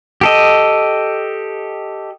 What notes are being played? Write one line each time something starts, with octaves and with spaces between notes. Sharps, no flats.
G4 A4 D#5